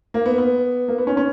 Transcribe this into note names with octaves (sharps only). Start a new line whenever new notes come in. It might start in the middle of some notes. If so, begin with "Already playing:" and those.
A#3
B3
B3
A#3
B3
C#4
C#4